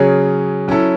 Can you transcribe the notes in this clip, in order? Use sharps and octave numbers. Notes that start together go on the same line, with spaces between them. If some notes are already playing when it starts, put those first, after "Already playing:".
Already playing: C#3 F#3 C#4 G#4
F#3 C#4 E4 A4